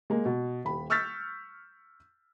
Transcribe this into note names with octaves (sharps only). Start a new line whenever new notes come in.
G#3 A#3
B2
D#1 B5
C#6 E6 F6 G6 A6 B6